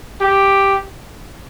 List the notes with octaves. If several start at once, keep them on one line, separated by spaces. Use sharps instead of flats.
G4